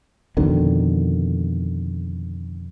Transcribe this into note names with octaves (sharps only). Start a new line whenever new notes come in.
F2 B2 D3 D#3